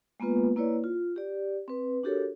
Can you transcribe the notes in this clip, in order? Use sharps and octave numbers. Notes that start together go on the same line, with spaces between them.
G#3 A#3 B3 F4 B4
A#3 E4 B4 C#5 D5
F4
G4 D5
C4 B4
D4 F#4 G4 A4 A#4 C#5